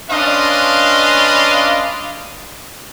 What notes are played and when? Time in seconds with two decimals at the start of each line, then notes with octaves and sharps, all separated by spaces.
0.10 C#4 D4 B4 D#5 F5 C6